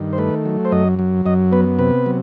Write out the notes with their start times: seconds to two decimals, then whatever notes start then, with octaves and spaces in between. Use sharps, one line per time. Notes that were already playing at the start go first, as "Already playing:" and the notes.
Already playing: G2 D#3
0.13 C5
0.18 A3 B4
0.46 F#3
0.65 C5
0.72 F#2 D#5
0.99 F#3
1.26 F#2 D#5
1.52 B3 B4
1.79 C3 B4
2.06 F#3